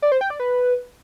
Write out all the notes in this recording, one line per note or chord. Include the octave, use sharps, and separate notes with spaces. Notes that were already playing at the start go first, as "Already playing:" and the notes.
D5
C5
G5
D5
B4